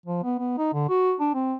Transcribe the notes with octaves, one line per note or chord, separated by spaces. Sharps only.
F3
B3
B3
D#4
D3
F#4
D4
C4